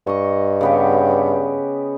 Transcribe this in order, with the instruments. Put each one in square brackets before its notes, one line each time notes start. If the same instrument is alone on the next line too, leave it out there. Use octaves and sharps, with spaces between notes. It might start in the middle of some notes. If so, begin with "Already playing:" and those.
[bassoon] G2 [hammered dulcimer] D#5 C#6
[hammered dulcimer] C#3 B3 G4